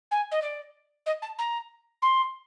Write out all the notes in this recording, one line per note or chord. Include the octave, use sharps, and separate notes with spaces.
G#5
D#5
D5
D#5
A5
A#5
C6